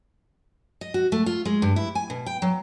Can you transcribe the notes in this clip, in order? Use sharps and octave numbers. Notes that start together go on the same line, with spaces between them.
D#5
F#4
A3
F4
G#3
G2
E4
G#5
B2
G5
F#3